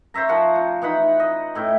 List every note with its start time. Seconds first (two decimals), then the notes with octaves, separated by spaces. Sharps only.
0.14 C5 C#5 E5 A#5
0.29 F3 A#4 F#5
0.55 F4
0.82 E3 D#4 F#5 B5
1.20 D#5
1.55 A2 E4 G5